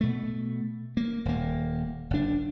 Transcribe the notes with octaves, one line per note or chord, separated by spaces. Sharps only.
B2 A3
A#3
D#1 A#3
F#1 D4